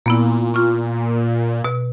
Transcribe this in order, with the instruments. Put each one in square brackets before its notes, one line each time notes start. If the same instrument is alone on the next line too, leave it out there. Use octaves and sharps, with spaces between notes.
[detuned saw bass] A#2 [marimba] A#3 B3 E4
[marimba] F4 C#6
B2